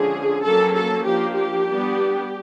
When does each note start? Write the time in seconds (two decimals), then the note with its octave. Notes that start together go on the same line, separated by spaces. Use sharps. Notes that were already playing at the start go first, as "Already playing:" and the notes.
Already playing: D3 F3 G#3 C#4 G#4
0.44 F#3 A#3 C#4 A4
0.76 A4
1.06 F3 A#3 D4 G4
1.38 G4
1.68 G3 B3 D4